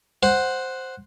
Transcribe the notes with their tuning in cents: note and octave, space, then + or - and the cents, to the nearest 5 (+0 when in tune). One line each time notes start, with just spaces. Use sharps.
C5 +0 F#5 +0